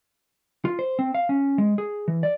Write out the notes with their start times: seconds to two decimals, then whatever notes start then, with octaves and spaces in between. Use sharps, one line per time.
0.65 F4
0.79 C5
0.99 C4
1.15 F5
1.29 C#4
1.58 G#3
1.78 G#4
2.08 E3
2.23 D5